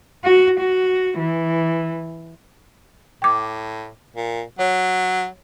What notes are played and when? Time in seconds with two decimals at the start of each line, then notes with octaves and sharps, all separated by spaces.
0.24 F#4
0.60 F#4
1.19 E3
3.22 A2 G5 D6
4.16 A#2
4.59 F#3 C#5